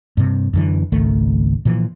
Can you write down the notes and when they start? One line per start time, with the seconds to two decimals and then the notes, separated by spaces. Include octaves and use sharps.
0.17 G2 C3
0.54 F#2 D3 E3
0.92 G#1 C#2 D#3 A3
1.65 A#2 E3 F3